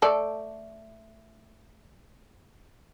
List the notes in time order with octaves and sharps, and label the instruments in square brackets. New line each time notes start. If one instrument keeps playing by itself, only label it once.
[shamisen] A3 A4 D5